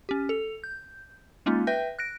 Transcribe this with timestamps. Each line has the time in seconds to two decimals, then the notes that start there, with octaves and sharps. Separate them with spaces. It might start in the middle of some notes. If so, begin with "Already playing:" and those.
0.09 C#4 G4
0.29 A4 F7
0.64 G6
1.46 G#3 A#3 C#4 D#4 F4
1.67 B4 E5 G5 G6 A#6
1.99 F#6 A#6 D7